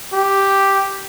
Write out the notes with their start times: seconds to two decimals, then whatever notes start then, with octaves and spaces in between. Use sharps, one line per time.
0.14 G4